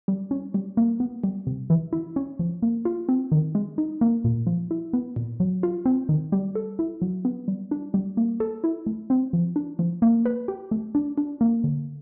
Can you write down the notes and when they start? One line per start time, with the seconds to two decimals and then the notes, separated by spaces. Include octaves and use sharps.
0.08 G3
0.31 C#4
0.54 G3
0.77 A#3
1.00 B3
1.24 G3
1.47 C3
1.70 E3
1.93 E4
2.16 C#4
2.39 F3
2.62 A#3
2.85 F4
3.09 C4
3.32 D#3
3.55 G#3
3.78 D#4
4.01 A#3
4.24 A#2
4.47 F3
4.71 E4
4.93 B3
5.16 A#2
5.40 F#3
5.63 F4
5.86 C4
6.09 D#3
6.32 G3
6.55 A4
6.79 E4
7.02 F#3
7.25 B3
7.48 G3
7.71 D4
7.94 G3
8.17 A#3
8.40 A4
8.64 E4
8.86 A3
9.10 C4
9.33 F3
9.56 D4
9.79 F3
10.02 A#3
10.25 B4
10.48 G4
10.71 A3
10.95 D4
11.18 D4
11.41 A#3
11.64 D3